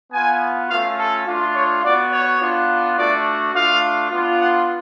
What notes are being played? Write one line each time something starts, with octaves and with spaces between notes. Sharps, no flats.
B3 F4 G#5
A3 C#4 F4 F5
A4
A3 D4 F4
C#5
B3 F#4 D5
C#5
B3 D4 F4
A3 D4 F#4 D5
A3 D4 F4 F5
B3 D4 F4
F#5